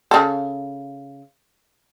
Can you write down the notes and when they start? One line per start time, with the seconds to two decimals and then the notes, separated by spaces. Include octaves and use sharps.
0.11 C#3 A4